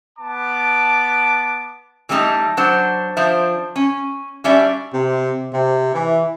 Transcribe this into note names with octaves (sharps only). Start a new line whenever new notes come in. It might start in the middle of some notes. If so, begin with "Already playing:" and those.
B3 A5 D6
E3 G3 A3 C#4 D#4
F#3 D4 F#4 C5
F3 D4 C5 E5
C#4
G3 C#4 D4 F#4 D5 E5
C3
C3
E3